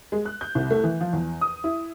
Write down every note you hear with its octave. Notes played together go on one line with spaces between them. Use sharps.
G#3
F#6
G6
C2
A3
E3
F3
E2
D#6
E4